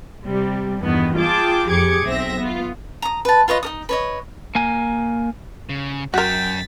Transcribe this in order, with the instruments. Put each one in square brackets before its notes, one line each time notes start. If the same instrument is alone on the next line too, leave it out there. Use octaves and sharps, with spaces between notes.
[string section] C3 G3
E2 G2 B2 D#3 B3
F4 G#4 G5 A5 D6
F2 G4 G#4 D6 G#6 C#7
B1 C4 C5 E5 A#6
B3 F4
[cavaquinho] A#5 D#6
B4 A5
F4 B4 C#5 D#5
D#4 A#4 D#6
B4 C#5 D#5
[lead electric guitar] A#3 G#5
C#3
[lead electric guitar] F#2 [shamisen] F#4 A#4 [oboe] G5 [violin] A6 B6